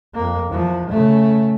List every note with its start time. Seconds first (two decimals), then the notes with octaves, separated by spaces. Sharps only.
0.14 F2 A#3
0.49 E2 F3
0.90 C#3 A3